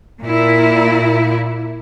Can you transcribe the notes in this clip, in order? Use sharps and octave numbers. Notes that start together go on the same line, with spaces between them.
A#2 E4